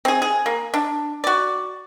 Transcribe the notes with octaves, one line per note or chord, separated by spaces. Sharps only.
C4 G#4
G#4
A#3
D4
F#4 D5